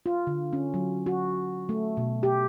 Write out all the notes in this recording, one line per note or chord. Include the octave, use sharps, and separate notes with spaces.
F4
D3
C#4
F#3
F#4
A3
B2
G4